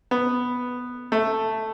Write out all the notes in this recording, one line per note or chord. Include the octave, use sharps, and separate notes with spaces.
B3
A3